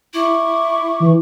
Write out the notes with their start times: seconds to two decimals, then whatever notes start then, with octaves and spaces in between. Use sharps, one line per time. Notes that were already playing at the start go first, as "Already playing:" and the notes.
0.14 E4 E5 C#6 D6
1.00 E3